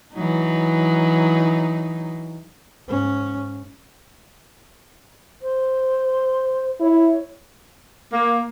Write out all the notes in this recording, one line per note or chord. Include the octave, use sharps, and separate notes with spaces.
E3 F#3 D#4
G#2 C#4
C5
E4 C#5
A#3